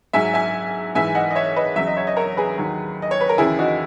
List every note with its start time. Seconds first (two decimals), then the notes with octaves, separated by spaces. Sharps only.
0.13 G#2 F#3 E5 G#5
0.34 E5 G#5
0.95 G#2 E3 E5 G#5
1.15 D#5 F#5
1.30 D#5
1.35 C#5 E5
1.56 B4 D#5
1.76 E2 C#3 F#3 E5
1.87 D#5
1.97 C#5 E5
2.07 D#5
2.17 A#4 C#5
2.37 G#4 B4
2.58 D#2 D#3 F#3
3.02 D#5
3.11 C#5
3.21 B4
3.29 A#4
3.38 D#2 C#3 E3 E4 G#4
3.59 D#4 F#4